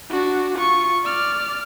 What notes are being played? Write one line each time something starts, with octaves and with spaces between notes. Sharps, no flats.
D4 F#4
F4 C#6
D5 F6